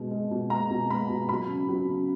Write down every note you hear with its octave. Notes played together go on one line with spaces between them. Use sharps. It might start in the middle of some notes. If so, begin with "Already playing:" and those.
Already playing: B2 G#3
G#3
B2
G#3 A#5
B2
G#3 B5
B2
F#3 B5
C#3
F#3
C#3